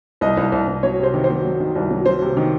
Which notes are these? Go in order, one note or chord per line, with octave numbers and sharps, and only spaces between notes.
C2 D#5
C2
C2
C2
F#3 C#5
C3 C5
D#3
C5
F#3
F#3
D#3
C2
F#3
F#3 C5
C3
D#3